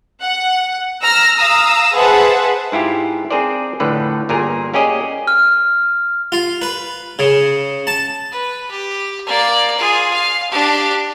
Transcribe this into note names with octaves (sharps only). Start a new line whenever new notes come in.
F#5
A#5 E6 F6 A#6
F5 A#5 D#6 E6
G#4 B4 C5 E5 F#5 A5
G#2 E4 F4 G4
C4 D4 G#4 A#4 C5 D5
F2 A2 D3 B4
G1 A#2 G#4 A#4
A#3 C#4 G4 G#4 D5 D#5
F6
F4
B4
C#3
A5
B4
G4
A#3 D5
F4 G#4
F5
D4 G4